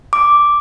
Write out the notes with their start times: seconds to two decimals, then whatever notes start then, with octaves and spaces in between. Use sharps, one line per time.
0.13 D6